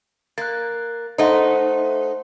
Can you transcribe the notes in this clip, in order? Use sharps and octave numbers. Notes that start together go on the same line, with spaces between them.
A#3 F#6 A6
A3 D#4 C5 F#5 C6